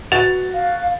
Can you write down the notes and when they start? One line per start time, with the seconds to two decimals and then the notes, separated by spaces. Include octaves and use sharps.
0.12 F#4 B4 A6 F7
0.53 F5